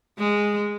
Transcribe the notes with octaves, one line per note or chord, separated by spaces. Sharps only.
G#3